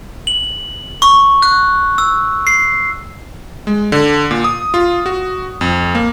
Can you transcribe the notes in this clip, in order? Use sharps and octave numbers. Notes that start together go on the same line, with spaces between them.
F#7
C#6
F#6
E6
C7
G#3
D3
A#2
D#6
F4
F#4
F2
A#3